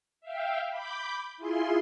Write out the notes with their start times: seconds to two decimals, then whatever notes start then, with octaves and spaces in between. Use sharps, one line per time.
0.21 E5 F5 G5
0.70 B5 D6 G6
1.37 E4 F4 G#4 C6